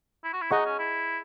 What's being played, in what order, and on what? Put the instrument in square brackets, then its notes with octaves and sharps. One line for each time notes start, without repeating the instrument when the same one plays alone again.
[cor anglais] E4
F#4
E4
[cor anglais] D#4 [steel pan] G#4 D#5 F#5 A#5 C#6
[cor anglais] C#4
E4